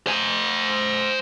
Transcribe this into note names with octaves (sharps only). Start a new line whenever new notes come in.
C5 G#5